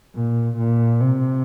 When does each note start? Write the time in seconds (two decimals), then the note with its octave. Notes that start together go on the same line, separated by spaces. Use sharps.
0.15 A#2
0.58 A#2
1.01 C3